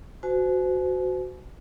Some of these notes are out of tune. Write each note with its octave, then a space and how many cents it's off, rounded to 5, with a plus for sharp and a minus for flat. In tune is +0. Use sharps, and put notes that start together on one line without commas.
F#4 +0 C5 -40 G#5 +45